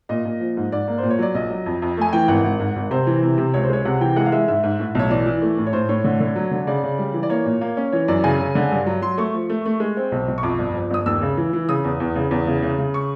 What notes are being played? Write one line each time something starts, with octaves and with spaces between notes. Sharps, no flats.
A#2 D#5
A#2
F3
G#2
G#2 D5
A#3
C5
A#2
C#5
F#3 D5
A#1 D#5
F#3
F2
F2
A3 G#5
E3 G5
G#1 F#5
G#1
G#2
G#1
C3 C5
E3
C3
C3
C#2 C#5
C5
G#3 C#5
C3 F#5
E3 G5
G#3 F#5
F5
G#3 E5
G#2 E5
G#2
A2
B1 C#5
E3 D5
E3
A3
A2
C#5
A2 C5
A2 C#5
D3
D3
F#3
D3
C#3 D5
C#3
G3
E3
D5
A#3 C#5
A#2
A#3
C#4
E3 C#5
F#2 D5
C#3 G#5
C#3
D3
G2
F#3
F#3 C6
A3 C#6
F3
A3
A3
G#3
C4
B1
B1
C#6
F2 D6
G1
F3
G1 D#6
D#2 E6
C#3
E3
E3
C#3 D#6
E2
E2
C#3
E2
C#3
C#3
C#3
C#6